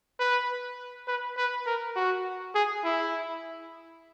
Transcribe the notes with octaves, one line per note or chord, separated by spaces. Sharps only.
B4
B4
B4
A#4
F#4
G#4
E4